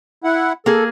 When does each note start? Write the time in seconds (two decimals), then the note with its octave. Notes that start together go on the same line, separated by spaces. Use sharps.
0.24 E4 F#5
0.66 A#3 G#4 A4